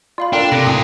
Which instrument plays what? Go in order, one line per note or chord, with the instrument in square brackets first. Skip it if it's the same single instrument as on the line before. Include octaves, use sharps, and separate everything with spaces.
[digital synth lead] F4 [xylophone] D5 F5 B5
[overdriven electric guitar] D4 [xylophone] A4 A#4 A#5 [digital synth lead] G5
[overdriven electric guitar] C3 [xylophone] D6 F#6 A#6
[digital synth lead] A2 [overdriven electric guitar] F4 G#5 [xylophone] D#6